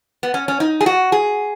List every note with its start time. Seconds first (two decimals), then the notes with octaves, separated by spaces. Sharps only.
0.23 B3
0.34 C#4
0.48 C#4
0.60 D#4
0.81 G#4
0.86 F#4
1.12 G#4